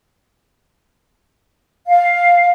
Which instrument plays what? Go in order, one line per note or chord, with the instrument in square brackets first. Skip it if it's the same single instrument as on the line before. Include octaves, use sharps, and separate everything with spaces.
[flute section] F5